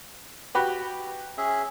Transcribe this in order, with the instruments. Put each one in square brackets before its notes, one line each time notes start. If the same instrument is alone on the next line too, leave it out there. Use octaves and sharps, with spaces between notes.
[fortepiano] F#4 G4 B4
[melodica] C#4 G#4 E5